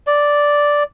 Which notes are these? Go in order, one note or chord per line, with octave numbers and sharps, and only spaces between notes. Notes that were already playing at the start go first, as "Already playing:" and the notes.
D5